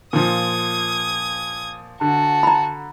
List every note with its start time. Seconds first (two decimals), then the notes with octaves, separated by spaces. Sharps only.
0.13 A#2 F3 D#6 G#6
2.01 D3 F#4 A5
2.43 A#5 B5